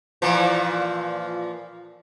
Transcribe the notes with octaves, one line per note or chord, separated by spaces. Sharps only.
A#2 E3 F3